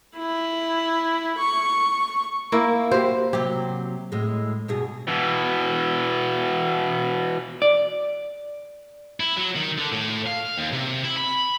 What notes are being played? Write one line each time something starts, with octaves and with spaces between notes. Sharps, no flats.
E4
C#6
A#3 E4
F#4 G4 C5
C3 F#3 G4
A2 G#3
G2 B2 G#4
B2 E3
D5
E4
F#3
D#3
D3
A2
F5
D#2
C3
E4
B5